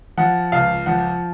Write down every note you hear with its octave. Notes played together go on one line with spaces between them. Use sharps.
F3 F#5
C#2 F5
F3 F#5